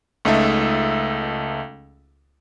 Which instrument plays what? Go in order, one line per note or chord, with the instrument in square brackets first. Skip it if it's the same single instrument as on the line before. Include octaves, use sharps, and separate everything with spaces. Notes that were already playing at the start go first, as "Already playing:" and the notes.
[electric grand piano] C#2 A3 D#4 A4 E5